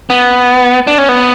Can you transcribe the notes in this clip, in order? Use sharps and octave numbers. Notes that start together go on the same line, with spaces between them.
B3
D4
C#4
B3